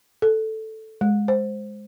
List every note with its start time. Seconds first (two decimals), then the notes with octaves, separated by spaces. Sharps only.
0.22 A4
1.01 G#3
1.28 C5